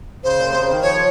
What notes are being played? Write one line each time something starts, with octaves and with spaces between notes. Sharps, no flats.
C#3 C5
A#2
C3
C#3
D#3
F3 C#5